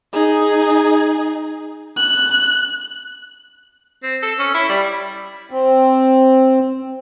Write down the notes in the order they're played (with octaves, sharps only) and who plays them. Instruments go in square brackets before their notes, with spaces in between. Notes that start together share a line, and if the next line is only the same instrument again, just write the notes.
[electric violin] D#4 G#4
F#6
[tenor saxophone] C4
A4
C#4
E4
G3
[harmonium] C4